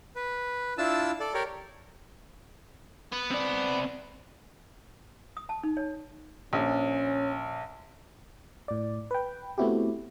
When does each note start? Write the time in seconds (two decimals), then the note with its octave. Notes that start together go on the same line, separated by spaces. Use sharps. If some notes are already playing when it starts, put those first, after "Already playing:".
0.15 B4
0.78 D4 E4 F4 A5 E6
1.20 A4 D5
1.34 G4 A#4 C#5 D5
3.13 B3
3.31 C4 D5
5.37 D#6
5.49 A5
5.63 D#4
5.77 C#5
6.53 A#1 C#4
8.68 A2 D5
9.11 B4 G5
9.58 A3 B3 C4 E4 F#4 G4